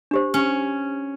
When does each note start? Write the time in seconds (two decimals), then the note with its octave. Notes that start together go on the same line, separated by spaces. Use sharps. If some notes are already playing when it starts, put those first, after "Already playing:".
0.11 D4 G4 C5
0.34 C#4